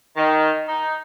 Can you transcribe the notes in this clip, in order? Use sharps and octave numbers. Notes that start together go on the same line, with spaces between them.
D#3
D#4